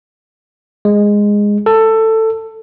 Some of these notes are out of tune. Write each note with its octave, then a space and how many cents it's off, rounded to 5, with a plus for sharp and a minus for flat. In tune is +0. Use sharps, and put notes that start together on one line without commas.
G#3 -10
A4 +15